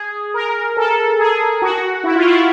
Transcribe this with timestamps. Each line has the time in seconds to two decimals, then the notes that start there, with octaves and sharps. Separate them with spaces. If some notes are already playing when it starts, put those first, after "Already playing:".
Already playing: G#4
0.34 A#4
0.77 A4
1.19 G#4
1.62 F#4
2.04 E4
2.16 F4
2.27 E4